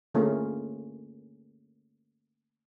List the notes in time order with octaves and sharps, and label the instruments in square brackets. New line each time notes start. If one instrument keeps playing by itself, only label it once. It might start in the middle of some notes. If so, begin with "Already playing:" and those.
[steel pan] D3 A3 A#3 C#4 F4 G#4